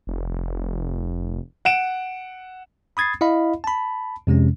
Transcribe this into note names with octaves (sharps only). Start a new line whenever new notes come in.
F1
F#5 D7 E7
B5 D#6 G#6 A6 C7
E4 D#5 F5 B5
A5 B5
F2 C3 G#3 C#4